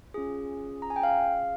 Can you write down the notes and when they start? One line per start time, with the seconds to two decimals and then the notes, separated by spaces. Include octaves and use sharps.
0.14 C#4 F4 G#4
0.82 A#5
0.90 G#5
0.96 G5
1.03 F5